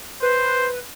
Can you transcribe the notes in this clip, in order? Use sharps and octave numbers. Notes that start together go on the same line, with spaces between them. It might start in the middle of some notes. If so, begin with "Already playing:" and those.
B4 C5